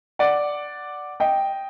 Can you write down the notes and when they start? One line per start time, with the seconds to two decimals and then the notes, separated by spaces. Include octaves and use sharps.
0.19 D5 F#5
1.20 D#5 G5